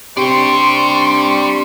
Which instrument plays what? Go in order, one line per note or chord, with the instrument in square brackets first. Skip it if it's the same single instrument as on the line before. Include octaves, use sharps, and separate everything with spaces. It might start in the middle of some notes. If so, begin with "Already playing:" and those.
[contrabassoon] C3 [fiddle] D4 C#6 [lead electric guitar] D5 G5 [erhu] C6